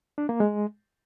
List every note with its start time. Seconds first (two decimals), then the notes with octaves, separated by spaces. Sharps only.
0.18 D4
0.29 A#3
0.40 G#3